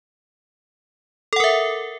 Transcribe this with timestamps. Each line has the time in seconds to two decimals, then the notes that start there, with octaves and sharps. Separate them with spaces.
1.33 A4
1.36 F#5
1.40 A#4
1.44 E5